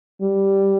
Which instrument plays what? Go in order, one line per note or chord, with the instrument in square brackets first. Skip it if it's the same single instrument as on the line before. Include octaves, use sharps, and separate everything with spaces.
[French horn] G3